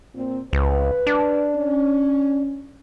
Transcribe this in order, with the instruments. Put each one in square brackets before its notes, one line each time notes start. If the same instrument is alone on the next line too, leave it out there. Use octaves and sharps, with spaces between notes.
[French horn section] A#2 C4
[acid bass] C#2 [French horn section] B4
[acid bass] D4
[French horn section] C#4